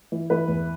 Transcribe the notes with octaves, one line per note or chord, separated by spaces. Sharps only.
E3
E3 B4
E2